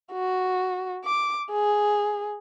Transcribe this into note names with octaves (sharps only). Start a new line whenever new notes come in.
F#4
D6
G#4